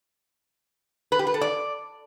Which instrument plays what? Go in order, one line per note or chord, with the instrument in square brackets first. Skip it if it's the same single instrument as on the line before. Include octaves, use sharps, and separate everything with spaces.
[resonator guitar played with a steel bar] B4
G4
B4
A4
D5